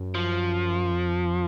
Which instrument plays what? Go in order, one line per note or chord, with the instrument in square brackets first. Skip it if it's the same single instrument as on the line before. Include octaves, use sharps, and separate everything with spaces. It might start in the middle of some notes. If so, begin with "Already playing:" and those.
Already playing: [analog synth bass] F#2
[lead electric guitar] F3
[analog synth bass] F2